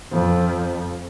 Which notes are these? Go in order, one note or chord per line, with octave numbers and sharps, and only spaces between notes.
F2